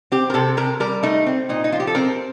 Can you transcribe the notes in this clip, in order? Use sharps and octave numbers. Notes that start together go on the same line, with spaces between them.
C4 G4
A#4
C3 A4
C3 A#4
G3 A#4
A3 D#4
C4
A#2 D#4
D#4
F3 F4
G4
A4
C4 A#4